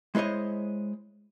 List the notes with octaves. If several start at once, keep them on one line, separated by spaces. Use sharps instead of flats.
G#3 E4 C5 C#5 D#5